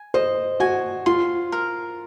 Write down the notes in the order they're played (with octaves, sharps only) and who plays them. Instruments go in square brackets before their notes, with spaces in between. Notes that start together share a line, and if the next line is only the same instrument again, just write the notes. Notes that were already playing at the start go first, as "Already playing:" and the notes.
Already playing: [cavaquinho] G#5
[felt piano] C5 [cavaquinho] D#5
[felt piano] F#4 [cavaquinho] G#5
[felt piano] F4 [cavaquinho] C6
[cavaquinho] A#4